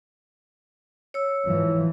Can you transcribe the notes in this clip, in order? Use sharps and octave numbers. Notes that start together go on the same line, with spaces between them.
C#5 E6
G#2 E3 F3